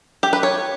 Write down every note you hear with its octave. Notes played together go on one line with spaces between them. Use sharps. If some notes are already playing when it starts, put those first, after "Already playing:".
G4
B4
C#5